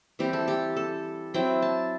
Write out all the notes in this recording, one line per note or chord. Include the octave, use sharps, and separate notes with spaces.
E3 G3 C4 E4 G4
A4
G4
A4
F#3 C4 E4 G5
A5